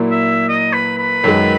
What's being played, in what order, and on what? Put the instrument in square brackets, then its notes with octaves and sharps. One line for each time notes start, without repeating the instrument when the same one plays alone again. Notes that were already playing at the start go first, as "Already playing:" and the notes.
Already playing: [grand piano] A#2 F#3 A#3 E4
[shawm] E5
D#5
B4
B4
[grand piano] F#2 D#3 G#3